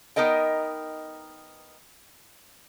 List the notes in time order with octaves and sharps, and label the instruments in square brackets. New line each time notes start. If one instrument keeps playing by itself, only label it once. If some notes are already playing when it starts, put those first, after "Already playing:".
[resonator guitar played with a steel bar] B3 D#4 A#4 D#5 G5